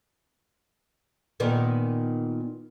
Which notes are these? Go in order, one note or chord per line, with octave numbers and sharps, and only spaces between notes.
A#2 D#3 B3